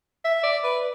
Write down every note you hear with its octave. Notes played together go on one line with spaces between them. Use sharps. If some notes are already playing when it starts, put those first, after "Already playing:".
E5
D5
B4